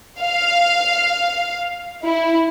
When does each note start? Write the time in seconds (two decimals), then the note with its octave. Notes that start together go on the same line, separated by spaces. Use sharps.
0.19 F5
2.04 E4